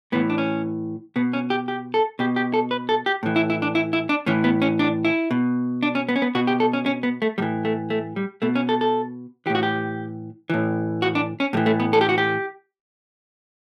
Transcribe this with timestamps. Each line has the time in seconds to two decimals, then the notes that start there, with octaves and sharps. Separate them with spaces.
0.12 A2 E3 B3
0.30 D4
0.38 C#4
1.16 B2 B3
1.33 C#4
1.50 G4
1.68 G4
1.94 A4
2.19 B2 G4
2.36 G4
2.54 A4
2.71 B4
2.89 A4
3.06 G4
3.23 A2 E3
3.36 E4
3.50 E4
3.62 D4
3.75 E4
3.93 E4
4.09 D4
4.26 A2 E3 C#4
4.44 B3
4.62 C#4
4.79 D4
5.05 E4
5.31 B2
5.83 D4
5.95 C#4
6.09 B3
6.16 C#4
6.22 B3
6.35 B2 F#4
6.47 G4
6.60 A4
6.73 C#4
6.86 C#4
7.03 B3
7.22 A3
7.38 A2 E3 G3
7.65 A3
7.90 A3
8.16 G3
8.42 B2 A3
8.55 C#4
8.69 A4
8.81 A4
9.46 E3 G4
9.50 A2
9.55 F#4
9.63 G4
10.50 A2 E3
11.02 F#4
11.15 D4
11.40 C#4
11.53 A2 G3
11.57 E3
11.66 A3
11.80 B3
11.93 A4
12.01 G4
12.09 F#4
12.18 G4